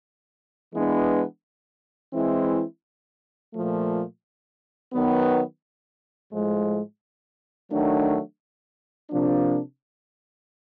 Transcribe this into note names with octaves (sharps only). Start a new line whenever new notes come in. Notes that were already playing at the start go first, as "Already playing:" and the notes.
E3 G#3 B3 D4
E3 G#3 C4 E4
A#2 F3 A3
D#3 F#3 B3
A2 F3 G#3
D#3 F#3 A3 D4
C3 F3 A#3 D4